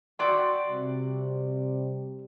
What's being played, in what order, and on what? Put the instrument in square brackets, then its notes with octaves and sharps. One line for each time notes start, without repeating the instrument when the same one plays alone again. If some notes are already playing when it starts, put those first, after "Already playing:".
[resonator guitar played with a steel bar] F#4 D5 G5 [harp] C6 E6 B6
[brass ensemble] C3 G3